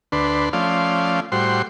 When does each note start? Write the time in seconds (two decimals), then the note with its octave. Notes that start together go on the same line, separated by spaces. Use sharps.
0.12 D2 D4 B4 C6
0.53 F3 A3 C#4 D5 F5 C6
1.32 A2 G3 F#4 C5 C6